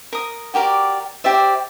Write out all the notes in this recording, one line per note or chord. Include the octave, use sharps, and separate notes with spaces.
A#4 D#6
F#4 G4 A#4 D5
G4 C5 D5 E5